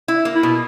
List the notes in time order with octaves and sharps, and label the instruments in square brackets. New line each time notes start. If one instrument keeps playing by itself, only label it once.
[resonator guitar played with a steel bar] E4
A#3
[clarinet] E4
[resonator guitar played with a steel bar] B2